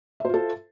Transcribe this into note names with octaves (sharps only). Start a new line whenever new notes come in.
F4 A4 C5 E5